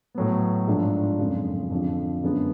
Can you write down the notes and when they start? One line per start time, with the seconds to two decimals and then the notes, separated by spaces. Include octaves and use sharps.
0.14 A2 F#3 B3
0.67 G#2 F3 A3 D4 F4
1.19 F#1 F2 C#3 F3 G#3
1.71 F2 D3 F3
2.23 F#2 D3 G#3 B3